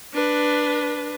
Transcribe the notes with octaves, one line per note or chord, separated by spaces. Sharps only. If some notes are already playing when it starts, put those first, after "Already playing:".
D4 B4